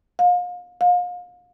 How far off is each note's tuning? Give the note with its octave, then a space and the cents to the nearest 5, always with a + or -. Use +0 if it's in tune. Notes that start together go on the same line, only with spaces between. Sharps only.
F5 +35
F5 +35